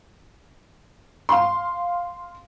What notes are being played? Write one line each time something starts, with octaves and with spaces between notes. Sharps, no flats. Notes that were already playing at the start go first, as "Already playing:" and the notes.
F5 C6